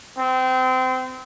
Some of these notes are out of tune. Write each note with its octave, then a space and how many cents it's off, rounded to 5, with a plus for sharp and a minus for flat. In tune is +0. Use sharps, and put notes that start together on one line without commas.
C4 -25